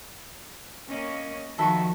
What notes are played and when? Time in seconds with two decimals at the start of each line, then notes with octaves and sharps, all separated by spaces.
0.89 A#3 C#4 D#5
1.58 D#3 F3 F#4 A4 B4 E5